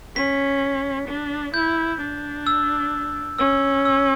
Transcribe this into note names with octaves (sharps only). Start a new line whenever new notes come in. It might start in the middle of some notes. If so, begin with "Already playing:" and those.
C#4 B6
D4
E4 G6
D4
E6
C#4 E6
E6